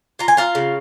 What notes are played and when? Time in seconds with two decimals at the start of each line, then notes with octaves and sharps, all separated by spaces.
0.19 F4 A#5
0.28 G#5
0.37 F4 F5 A#5
0.55 C#3